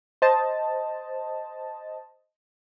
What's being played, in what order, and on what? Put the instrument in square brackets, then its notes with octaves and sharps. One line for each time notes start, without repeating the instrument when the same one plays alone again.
[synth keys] C5 D#5 A5